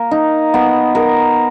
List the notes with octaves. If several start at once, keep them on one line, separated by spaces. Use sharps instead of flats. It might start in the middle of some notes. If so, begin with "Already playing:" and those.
Already playing: A#3 A#4
D#4
B3
A#4